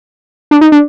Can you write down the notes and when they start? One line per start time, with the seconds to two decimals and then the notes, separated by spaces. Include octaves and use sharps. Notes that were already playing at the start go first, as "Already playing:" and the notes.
0.51 D4
0.61 D#4
0.72 D4